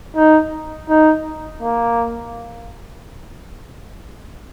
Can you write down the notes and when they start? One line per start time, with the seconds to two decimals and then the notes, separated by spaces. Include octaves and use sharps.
0.16 D#4
0.89 D#4
1.62 A#3